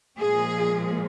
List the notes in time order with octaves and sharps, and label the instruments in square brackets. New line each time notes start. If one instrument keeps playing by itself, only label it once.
[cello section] A#2 F3 G#3 G#4